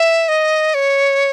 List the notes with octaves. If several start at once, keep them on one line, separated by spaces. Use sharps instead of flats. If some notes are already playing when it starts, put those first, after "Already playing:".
Already playing: E5
D#5
C#5